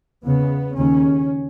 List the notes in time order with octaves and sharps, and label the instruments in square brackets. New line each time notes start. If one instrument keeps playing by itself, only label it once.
[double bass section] E2 C#3 B3
D#2 C#3 C#4